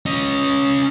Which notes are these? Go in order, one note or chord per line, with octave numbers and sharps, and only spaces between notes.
C#4 D#5